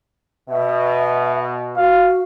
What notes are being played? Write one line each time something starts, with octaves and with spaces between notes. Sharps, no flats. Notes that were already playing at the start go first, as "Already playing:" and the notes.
B2 E5
F#4 F5